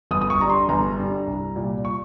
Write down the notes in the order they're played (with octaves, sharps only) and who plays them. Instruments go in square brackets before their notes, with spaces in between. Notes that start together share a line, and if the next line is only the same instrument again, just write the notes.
[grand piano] G1 D#6
D#6
C#6
G2 G3 A#5
C6
G1 A#5
G2 G3
C2
A#2 G3
C#6